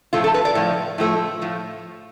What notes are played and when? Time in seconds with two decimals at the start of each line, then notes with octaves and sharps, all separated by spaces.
0.13 A2 F3 A3 F4
0.24 A4
0.34 B4
0.45 D5
0.55 A2 F3
0.98 A2 F3 A3
1.42 A2 F3